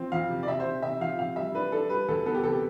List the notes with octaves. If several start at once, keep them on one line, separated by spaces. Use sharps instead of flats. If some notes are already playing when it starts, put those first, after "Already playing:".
Already playing: F3 C4
F2 F5
C3
D5
C3 E5
C5
C3
C3 E5
F3 F5
C3 F5
G3 E5
D4 B4
D4 A4
G3 B4
D2 A4
B3 A4
G4
C3 A4
G4